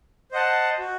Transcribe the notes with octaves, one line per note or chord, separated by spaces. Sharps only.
C5 D#5 F#5 A5
F#4